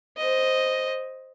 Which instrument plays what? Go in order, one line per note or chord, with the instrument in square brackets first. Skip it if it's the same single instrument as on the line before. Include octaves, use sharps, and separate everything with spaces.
[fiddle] C5 D#5